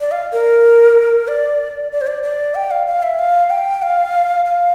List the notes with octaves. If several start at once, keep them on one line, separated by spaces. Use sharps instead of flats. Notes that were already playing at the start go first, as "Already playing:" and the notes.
D5
F5
A#4
D5
D5
C5
D5
D5
G5
F5
F5
E5
F5
G5
F5
F5